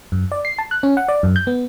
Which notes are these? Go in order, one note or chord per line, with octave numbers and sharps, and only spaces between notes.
F#2
D5
C7
A5
F#6
C#4
F#5
D5
F#2
G6
B3